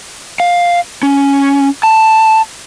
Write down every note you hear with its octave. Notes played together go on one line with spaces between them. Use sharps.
F5
C#4
A5